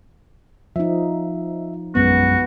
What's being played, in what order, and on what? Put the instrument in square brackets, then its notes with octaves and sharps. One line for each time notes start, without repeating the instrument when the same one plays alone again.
[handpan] F3 D#4 [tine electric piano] E5
[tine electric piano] A#1 F#2 G#3 [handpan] B3 [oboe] F#4